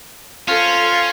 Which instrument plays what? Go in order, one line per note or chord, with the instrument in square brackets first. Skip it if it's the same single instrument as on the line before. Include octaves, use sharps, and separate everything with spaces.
[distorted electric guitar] C#4 [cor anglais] F4 [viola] A4 C5